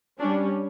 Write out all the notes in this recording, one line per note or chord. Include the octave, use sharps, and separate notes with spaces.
G3 C#4 D4